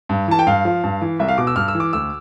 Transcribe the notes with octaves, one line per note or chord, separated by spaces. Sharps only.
G2
E3 A5
G5
G2 F5
F3
G2
E3
C2 E5
F5
B2 D6
E6
G2 F6
E6
E3
D6
D2 E6